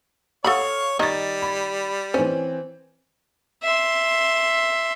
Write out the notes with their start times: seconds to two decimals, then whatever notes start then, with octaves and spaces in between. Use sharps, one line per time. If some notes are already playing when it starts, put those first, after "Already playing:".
0.44 A4 C#5 F5 F#5 B5 D#6
0.99 D#3 G3 D#4 G#6 A6
1.42 B5
2.14 E3 C4 C#4
3.63 E5 C6